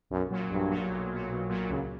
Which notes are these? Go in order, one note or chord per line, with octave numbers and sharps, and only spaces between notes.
B1 F#2
A#2 F#3
B1 G2
A#2 F#3
B1
A#2 F#3
B1 B2
A#2 F#3
C#2 C#3